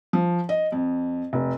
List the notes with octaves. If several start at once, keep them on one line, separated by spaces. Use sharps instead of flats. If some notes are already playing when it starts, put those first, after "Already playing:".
F3
D#5
F2
F1